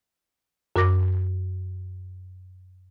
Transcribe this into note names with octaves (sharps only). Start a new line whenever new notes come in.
F#2 F#4 A#4 D6 A#6